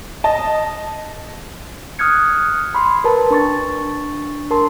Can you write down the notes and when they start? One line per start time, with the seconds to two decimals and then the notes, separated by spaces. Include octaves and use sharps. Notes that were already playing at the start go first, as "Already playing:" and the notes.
0.24 D#5 A5
1.99 D#6 F6 F#6 G#6 C#7
2.75 B5 C6
3.04 A#4 B4 A5
3.31 D4 C#6 A6
4.51 A#4 A5 C6